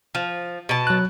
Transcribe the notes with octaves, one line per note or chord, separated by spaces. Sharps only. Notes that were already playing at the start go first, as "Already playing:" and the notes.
F3
B2 A5
F#3 F#6